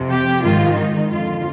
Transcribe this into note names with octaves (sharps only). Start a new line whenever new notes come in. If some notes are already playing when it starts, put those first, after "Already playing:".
Already playing: F2 C3 F3
G4
G#2 D#3 F4
D#4
F2 D3 F3 F4